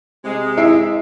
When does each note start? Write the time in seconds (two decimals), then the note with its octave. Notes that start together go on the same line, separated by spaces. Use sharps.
0.24 C3 G#3
0.57 E4 E5 C7 D7